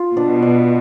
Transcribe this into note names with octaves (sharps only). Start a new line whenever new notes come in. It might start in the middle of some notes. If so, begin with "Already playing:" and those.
Already playing: F4
B2 D4
D4